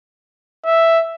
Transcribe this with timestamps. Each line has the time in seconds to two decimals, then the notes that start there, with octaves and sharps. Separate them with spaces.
0.66 E5